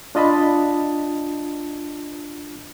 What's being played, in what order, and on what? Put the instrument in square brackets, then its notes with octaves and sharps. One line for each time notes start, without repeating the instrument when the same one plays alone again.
[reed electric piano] D4 F4 D#5 A5 B5